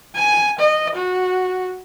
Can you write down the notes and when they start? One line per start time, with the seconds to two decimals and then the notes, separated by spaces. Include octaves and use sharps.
0.14 G#5
0.59 D#5
0.95 F#4